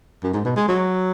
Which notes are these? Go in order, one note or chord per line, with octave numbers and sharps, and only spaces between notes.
F#2
G#2
B2
G#3
F#3